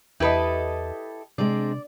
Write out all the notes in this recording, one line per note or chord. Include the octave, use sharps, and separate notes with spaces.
E2 E4 G4 A4 B4 D#5
C3 G#3 C4 D4 D5